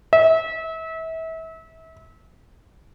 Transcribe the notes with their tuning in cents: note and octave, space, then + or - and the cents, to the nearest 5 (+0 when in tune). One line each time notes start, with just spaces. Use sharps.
E5 -30